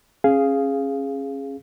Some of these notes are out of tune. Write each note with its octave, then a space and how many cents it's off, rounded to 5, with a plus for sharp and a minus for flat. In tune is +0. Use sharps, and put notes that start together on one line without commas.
C#4 -25 G#4 +0 F5 -5